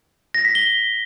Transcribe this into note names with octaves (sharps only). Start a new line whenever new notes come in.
A#6
B6
G7